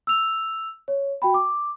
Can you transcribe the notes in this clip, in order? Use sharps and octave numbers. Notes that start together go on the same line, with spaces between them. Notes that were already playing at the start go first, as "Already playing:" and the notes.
E6 F7
C#5
F#4 G5 B5
D6